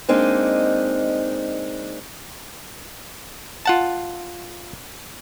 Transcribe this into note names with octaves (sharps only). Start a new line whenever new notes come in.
G#3 A#3 C4 D4 D#4
F4 F#5 A5